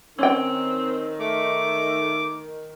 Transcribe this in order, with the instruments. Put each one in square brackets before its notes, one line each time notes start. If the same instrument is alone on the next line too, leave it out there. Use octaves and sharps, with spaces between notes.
[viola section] D#3 [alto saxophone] C4 [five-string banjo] C#4 G5
[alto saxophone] A3 [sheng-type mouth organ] D6